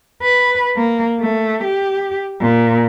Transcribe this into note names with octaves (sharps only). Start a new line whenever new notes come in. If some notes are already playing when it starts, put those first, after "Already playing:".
B4
A#3
A3
G4
A#2